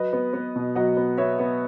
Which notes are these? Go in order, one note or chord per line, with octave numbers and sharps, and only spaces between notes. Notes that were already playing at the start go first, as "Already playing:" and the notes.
Already playing: F#3 B4 D#5
B3
B3
B2
F#3 D#5 F#5
B3
B3 C#5 E5
B3